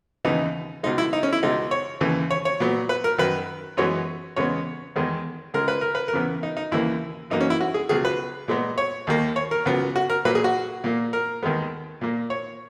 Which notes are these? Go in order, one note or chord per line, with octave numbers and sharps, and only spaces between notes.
D#2 C#3 E3 B3 D#4
C#2 B2 G#3 D#4
E4
D#4
C#4
E4
C#2 B2 G#3 D#4
C#5
D#2 C#3 E3
C#5
C#5
A#2 F#3 B3
B4
A#4
F#2 D#3 F#3 B4
F#2 E3 G#3 B3 C#5
E2 C#3 G#3 B3 C#5
E2 D#3 G#3 B3
C#2 C#3 G#3 A#4
B4
A#4
B4
A#4
E2 C#3 E3 B3
D#4
D#4
D#2 C#3 E3 A#3 E4
F#2 E3 A#3 D#4
C#4
E4
F#4
G#4
C#2 B2 F#3 G#4
B4
A#2 G#3 B3
C#5
D#2 D#3 A#3
C#5
A#4
C#2 C#3 F#3 B3
F#4
A#4
A#2 F#3 A#3 B4
G#4
F#4
A#2 A#3
A#4
D#2 D#3 G#3 B3
A#2 A#3
C#5